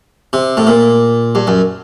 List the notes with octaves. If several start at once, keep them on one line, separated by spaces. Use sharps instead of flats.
C3
A2
A#2
G2
F#2